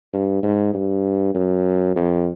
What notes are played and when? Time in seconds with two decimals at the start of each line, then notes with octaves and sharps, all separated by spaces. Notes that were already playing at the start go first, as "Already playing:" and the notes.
0.13 G2
0.43 G#2
0.74 G2
1.35 F#2
1.96 F2